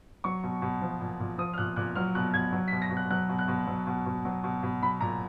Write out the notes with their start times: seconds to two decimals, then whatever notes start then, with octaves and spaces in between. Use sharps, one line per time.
0.24 F#3 C#6
0.43 B2
0.62 B2
0.82 F3
1.01 A#2
1.20 A#2
1.38 F3 D#6
1.54 F6
1.58 A#2 F#6
1.76 A#2 F#6
1.96 F#3 F6
2.15 B2 F#6
2.34 B2 G#6
2.53 F#3
2.68 B6
2.72 B2
2.82 A#6
2.91 B2
2.97 F#6
3.10 F#3 F#6
3.29 B2
3.39 F#6
3.48 B2
3.67 F#3
3.87 B2
4.06 B2
4.25 F#3
4.44 B2
4.63 B2
4.83 F#3 B5
5.01 A#2 A#5